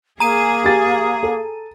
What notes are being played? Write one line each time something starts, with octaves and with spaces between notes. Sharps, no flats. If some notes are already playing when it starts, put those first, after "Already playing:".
A#3 G#4 A#5 D#7
G4 A6
A4